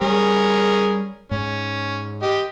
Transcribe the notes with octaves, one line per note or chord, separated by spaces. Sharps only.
G3 C#4 G#4 A#4
G#2 C#4
G4 D#5